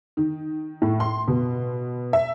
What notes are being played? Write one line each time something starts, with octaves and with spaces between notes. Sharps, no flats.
D#3
A2
C6
B2
E5